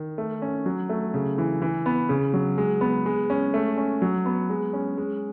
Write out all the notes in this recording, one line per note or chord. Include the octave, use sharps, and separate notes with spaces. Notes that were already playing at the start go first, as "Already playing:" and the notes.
Already playing: D#3
A3
C#4
F#3
A3
C#3
E3
E3
B3
C#3
F#3
G#3
B3
G#3
C#4
A3
C#4
F#3
B3
G#3
C#4
G#3